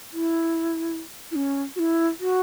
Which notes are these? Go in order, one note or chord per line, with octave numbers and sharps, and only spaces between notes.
E4
E4
C#4
F#4
E4
F#4